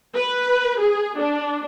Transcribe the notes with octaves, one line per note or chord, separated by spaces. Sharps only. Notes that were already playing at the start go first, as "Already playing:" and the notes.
B4
G#4
D4